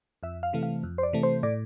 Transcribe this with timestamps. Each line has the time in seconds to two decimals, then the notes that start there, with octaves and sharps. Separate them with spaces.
0.23 F2 E5
0.43 F5
0.53 C3 E3 A3
0.63 F5
0.83 F2
0.98 C5
1.03 D5
1.13 C3 E3 A3
1.23 C5
1.43 A2 D5